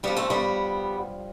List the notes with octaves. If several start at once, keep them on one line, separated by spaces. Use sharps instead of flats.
G2 F3 G3 B3
A3 C4
G3 B3